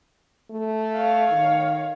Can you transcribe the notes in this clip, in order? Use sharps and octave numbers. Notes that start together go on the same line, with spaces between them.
A3
C#5 F5
D#3